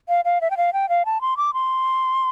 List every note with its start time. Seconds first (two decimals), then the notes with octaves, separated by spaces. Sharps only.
0.09 F5
0.25 F5
0.41 E5
0.51 G5
0.57 F5
0.73 G5
0.89 F5
1.06 A5
1.21 C6
1.37 D6
1.54 C6